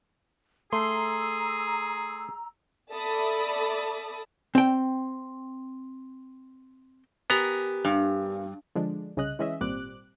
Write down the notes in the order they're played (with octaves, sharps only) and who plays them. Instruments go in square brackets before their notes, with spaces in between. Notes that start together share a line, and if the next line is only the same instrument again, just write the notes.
[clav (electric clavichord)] A3 [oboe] G#4 [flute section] A#5 E6 [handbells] C6
[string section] A4 D5 E5 A5 B5 D#6
[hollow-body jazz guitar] C4 G5
[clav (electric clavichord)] B3 A#5 [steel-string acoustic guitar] G4 A#4 G#5
[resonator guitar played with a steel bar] G2
[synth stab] D3 F3 G#3 D4
C2 C#3 C#4 D#5 F#6
E3 G#3 C#4 D#5 E5
G#1 A#2 G3 C4 D6 F#6